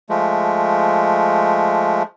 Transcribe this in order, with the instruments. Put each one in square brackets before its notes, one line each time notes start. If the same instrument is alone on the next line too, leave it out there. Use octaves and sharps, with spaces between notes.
[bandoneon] F3 G#3 A3